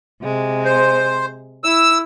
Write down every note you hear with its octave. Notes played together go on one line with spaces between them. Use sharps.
C3 G#3
C5
E4 E6